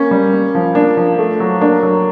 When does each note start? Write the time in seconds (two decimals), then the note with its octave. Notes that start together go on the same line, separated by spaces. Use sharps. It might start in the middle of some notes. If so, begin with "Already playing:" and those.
Already playing: A#3 C#4
0.11 G3
0.33 A#3
0.55 F3
0.75 A#3 D4
0.97 F3
1.19 A3
1.40 F#3
1.61 A#3 D4
1.83 F#3